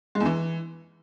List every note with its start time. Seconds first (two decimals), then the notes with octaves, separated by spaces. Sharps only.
0.15 G#3
0.20 E2
0.26 E3